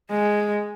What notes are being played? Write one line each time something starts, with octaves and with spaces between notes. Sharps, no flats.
G#3